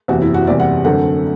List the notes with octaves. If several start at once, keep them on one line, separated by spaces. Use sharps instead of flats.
F#1 E2 C3 F#4
E4
F#4
F#1 E2 C3 G3 D5
F#5
F#2 D3 A3 C4 F#5